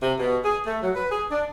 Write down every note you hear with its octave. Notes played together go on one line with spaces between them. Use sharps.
C3
B2
G#4
A3
F#3
B4
G#4
D4